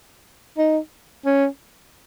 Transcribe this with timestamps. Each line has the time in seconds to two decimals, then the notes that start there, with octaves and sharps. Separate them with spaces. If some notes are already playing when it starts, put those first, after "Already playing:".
0.58 D#4
1.25 C#4